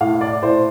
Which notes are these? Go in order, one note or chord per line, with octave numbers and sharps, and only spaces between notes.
A2 F5
D5
A2 C5